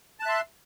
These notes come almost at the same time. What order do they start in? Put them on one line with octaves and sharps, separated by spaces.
A5 F#6 E5 C6